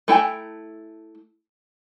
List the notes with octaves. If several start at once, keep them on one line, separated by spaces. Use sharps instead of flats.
A3 E4 G5 G#5 A#5